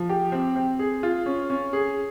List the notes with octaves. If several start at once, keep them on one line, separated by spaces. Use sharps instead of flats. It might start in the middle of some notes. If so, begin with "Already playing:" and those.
Already playing: F3
G4
C4
C4
G#4
F4
C#4
C#4
G#4